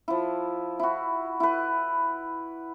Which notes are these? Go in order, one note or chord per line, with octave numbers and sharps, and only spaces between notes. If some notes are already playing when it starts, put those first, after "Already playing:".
F3 E4
E4 F#4
E4 B4